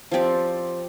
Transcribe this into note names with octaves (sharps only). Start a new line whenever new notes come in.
F3 C4 G4 D5